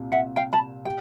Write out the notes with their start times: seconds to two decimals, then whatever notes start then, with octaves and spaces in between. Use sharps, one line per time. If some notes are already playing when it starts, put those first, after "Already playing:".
Already playing: C2 A#2
0.12 E5 F#5
0.36 F5 G5
0.53 A5 B5
0.85 G4 G5